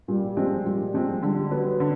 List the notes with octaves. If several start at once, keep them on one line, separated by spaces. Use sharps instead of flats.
A#2 G3
F3 G#3 C4
A#2 G3
F3 G#3 C4
D3 G3
F#3 B3
D3